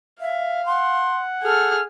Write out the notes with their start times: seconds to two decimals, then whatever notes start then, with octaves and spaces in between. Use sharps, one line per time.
0.21 E5 F5
0.65 F#5 C6
1.43 G#4 A4 F6